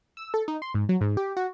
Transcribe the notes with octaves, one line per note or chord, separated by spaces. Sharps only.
E6
A4
D#4
C6
G#2
F#3
G#2
G4
F#4